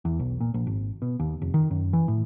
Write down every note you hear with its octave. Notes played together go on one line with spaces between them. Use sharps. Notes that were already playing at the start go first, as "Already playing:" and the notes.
E2
B1
A#2
A#1
G#1
B2
D#2
F1
D#3
F#2
E3
A2